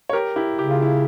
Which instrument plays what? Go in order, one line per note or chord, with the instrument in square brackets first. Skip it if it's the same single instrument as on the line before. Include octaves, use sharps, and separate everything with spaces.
[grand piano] C#5
G4 A#4
E4 G4
[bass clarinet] C#3 [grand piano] G4
[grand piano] F4
E4